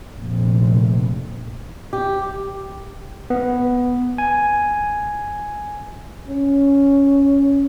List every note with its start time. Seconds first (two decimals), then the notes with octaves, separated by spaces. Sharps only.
0.15 F1 A#1 C3
1.93 G4
3.30 B3
4.18 G#5
6.28 C#4